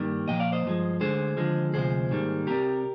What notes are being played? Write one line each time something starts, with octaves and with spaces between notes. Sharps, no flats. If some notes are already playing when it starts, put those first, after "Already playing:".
Already playing: G2 D#3 G3 A#3
A#2 F3 A#3 D#5 G5
D5 F5
C5 D#5
G2 F3 G#3
D2 D3 G#3 G#4 C5
D#2 D3 F3 G#3
D2 C3 F3 G#3 G#4 C5
G#2 D#3 G3 A#3
C2 C3 G3 G4 A#4